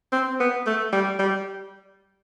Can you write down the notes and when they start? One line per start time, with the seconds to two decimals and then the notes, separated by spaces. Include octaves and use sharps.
0.12 C4
0.40 B3
0.66 A3
0.93 G3
1.19 G3